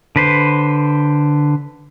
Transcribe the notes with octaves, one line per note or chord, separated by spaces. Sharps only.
D3 B4 C5